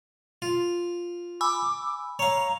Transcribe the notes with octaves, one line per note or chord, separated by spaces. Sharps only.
F4
G#5 B5 D6 E6
C#5 F5 A#5